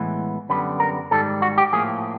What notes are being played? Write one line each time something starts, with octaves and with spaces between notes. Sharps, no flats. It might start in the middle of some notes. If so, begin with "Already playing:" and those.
Already playing: A2 E3 G#3 B3
F#2 D3 G3 B3 B4
A#4
G#2 D#3 G3 A4
F#4
G4
A2 F3 A#3 G#4